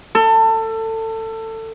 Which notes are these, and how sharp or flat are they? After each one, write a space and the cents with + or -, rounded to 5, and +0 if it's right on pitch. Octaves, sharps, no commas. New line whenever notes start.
A4 +25